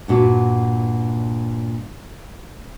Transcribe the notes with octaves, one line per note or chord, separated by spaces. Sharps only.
G2 A#2 F#4